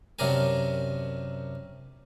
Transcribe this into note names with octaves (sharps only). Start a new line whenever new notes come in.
F#2 C3 D4 A#4 G#5